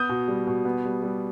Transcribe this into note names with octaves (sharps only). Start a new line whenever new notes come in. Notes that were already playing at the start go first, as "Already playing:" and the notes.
Already playing: B3 D#6 G6
B2
G3
B2
B3
G3
G3